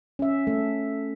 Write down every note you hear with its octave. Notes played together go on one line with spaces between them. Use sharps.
C#4 E5
A3